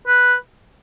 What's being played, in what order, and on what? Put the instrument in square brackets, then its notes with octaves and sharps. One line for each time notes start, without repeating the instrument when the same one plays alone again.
[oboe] B4